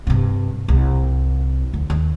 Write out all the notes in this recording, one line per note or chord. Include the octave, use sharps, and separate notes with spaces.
G2 C3
C2
D2
D#2